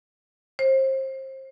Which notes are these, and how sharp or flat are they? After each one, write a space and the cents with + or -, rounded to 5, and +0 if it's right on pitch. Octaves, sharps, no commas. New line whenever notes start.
C5 +30